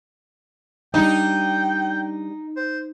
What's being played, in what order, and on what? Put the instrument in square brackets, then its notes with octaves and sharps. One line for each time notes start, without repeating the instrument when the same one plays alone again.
[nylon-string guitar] G3 D4 [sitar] D#4 [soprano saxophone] G5
[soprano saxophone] C5